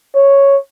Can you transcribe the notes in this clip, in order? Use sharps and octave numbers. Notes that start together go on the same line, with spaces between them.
C#5